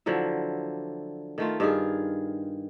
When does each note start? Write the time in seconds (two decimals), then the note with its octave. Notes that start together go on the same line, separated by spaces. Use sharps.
0.06 D3 F3 F#3 E4
1.38 D#3 A3 F4
1.60 G2 D#3 F4 G#4